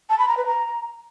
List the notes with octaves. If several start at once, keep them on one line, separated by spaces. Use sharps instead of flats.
A5
B5
A#5
B4
A#5